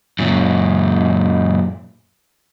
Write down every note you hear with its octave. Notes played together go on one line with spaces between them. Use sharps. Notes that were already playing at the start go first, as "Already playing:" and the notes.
F#2 A#2